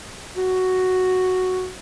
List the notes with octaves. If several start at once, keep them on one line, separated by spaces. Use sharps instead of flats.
F#4